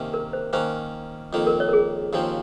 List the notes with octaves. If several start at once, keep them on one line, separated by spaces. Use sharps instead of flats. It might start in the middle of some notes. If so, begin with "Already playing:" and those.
Already playing: C3 D#3 A#3 C#4
A#4
C5
D#3 A#3 C#4 C5
F2 D#3 A#3
A#4
C#5
A#4
G#4
D#2 C#3 F3 C4